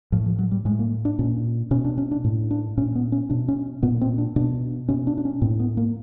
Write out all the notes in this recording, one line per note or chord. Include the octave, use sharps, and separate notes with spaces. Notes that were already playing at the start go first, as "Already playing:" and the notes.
A2 F3
F3
F#3
G3
A2 G#3
A#3
D4
A#2 C#4
B2 C#4
D4
C#4
D4
A2
D4
A#2 C#4
B3
C#4
B2 D4
C#4
A#2 B3
C4
D4
B2 D4
B2 C#4
D4
D4
C#4
A2 C4
B3
A#3